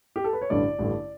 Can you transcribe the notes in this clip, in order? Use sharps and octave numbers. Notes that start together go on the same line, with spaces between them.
G4
A4
B4
C#5
A1 G2 D3 A3 D5
A1 G2 D3 A3